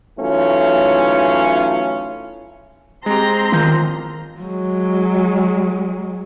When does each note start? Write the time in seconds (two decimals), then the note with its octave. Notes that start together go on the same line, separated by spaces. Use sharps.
0.19 E3 F#3 A3 C#4 D#4 F4
3.06 G#3 C4 G4 A#5 C6
3.52 A1 D#3 F4 G6
4.41 F#3 G#3